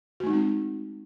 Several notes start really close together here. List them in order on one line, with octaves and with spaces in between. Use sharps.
F#4 A3 D#4 G#3 C4